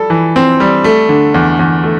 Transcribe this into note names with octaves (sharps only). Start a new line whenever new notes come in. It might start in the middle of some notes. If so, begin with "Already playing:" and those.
Already playing: G3 A4
E3
C4
G3
A3
D3
E2
E2
A3